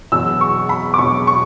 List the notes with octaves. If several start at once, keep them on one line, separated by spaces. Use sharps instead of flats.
E1 E2 B2 F#3 E6
C#6
B5
D6
E1 E2 B2 F#3 C#6
C#6